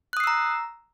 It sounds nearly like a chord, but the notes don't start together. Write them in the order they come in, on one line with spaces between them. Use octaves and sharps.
F#6 D#6 C7 E6 A#5